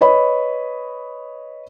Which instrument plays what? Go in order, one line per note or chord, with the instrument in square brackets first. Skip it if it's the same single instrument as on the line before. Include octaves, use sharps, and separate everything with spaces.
[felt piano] B4 C#5 D#5 B5